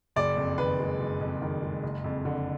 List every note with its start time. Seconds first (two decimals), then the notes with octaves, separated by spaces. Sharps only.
0.16 F#1 D5
0.37 F2
0.58 D#3 B4
0.79 G#3
1.00 F#1
1.21 F2
1.42 D#3
1.62 G#3
1.83 F#1
2.04 F2
2.25 D3